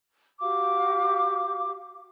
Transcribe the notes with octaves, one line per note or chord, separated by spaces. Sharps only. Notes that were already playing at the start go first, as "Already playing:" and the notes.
F#4 G4 F5 D6